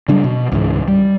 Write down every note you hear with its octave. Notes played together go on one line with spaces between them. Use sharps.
C#3 F#3 G3 D4
B2
C#2 G#2 E3
G3